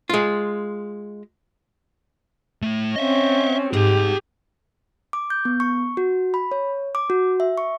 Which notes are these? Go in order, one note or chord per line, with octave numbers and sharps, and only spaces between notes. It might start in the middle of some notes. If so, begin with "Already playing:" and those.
G#3 F4
A2 A3
C4 C#4 D#5 E5
G#2 G4 G#4 G5
D6
G6
B3
C#6
F#4
B5
C#5
D6
F#4
E5
C#6